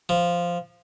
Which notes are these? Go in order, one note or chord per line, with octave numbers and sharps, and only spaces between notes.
F3